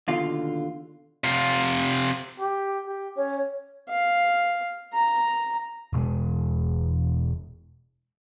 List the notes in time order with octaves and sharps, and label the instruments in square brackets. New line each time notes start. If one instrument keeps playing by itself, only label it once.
[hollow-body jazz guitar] D#2 B2 D3 F4 F5
[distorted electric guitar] C3 F4
[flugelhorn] G4
G4
[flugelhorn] C#4 [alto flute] C#5
[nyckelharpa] F5
A#5
[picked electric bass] E1 B2 G#3